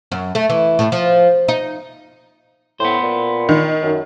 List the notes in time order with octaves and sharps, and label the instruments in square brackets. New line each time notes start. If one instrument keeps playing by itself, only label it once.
[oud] F#2
A3
E3
A2
F3
D#4
[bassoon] A2 [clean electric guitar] B3 C5
[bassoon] A#2
[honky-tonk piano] D#3
[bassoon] F#2